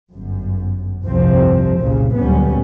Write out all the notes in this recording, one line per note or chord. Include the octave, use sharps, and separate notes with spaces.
G1 F#2
G1 C2 F2 C3 F3 C4
F#1 C2 A#2 C#3
D2 A#2 F#3 G3 B3 C#4